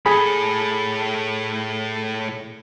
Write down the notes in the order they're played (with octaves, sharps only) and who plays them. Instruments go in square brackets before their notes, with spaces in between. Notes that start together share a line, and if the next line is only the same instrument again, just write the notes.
[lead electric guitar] A2 A4 [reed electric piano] G#4 B5